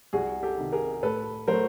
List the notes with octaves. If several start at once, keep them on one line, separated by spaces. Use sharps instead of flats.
C2 F#4 G#4
G4 A4
C3 D#3
G#4 A#4
A2 A4 B4
F#3 A3 A#4 C5